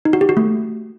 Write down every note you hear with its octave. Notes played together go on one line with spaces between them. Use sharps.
D#4
F#4
G4
F#4
A3